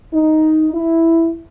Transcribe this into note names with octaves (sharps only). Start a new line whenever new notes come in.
D#4
E4